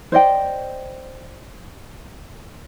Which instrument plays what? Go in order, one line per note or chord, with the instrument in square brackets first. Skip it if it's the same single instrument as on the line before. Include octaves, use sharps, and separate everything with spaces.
[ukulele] C5 D5 D#5 G5